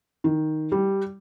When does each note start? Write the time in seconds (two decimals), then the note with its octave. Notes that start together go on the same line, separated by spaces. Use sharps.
0.24 D#3
0.72 G3